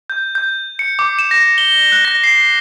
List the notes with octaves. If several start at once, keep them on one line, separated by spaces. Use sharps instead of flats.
G6
G6
C#7
D6
E7
A#6
G7
F#6
A#6
C7